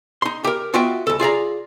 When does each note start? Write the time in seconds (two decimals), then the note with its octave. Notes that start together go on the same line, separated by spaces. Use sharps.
0.22 D#4 C6
0.44 G4 A#4
0.74 B3 F4 F#4 D#5 E5 G5
1.07 C#2 A4
1.20 F4 G#4 D5 A#5